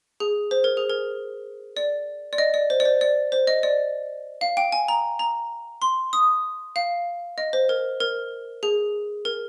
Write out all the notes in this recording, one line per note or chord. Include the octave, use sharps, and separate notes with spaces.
G#4
C5
A#4
G#4
A#4
D5
D5
D#5
D5
C5
D5
C5
D5
C5
D#5
D5
F5
G5
G#5
A#5
A#5
C6
D#6
F5
D#5
C5
A#4
A#4
G#4
A#4